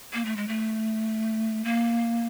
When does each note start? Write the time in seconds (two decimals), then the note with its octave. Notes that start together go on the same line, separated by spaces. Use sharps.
0.14 A#3
0.25 A3
0.36 G#3
0.48 A3
1.64 A#3